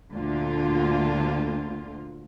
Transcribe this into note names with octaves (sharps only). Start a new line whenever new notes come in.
D2 A#2 D3 F4